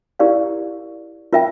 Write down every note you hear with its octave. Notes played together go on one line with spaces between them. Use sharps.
E4 G4 A#4 D5 F5
F4 A#4 E5 G5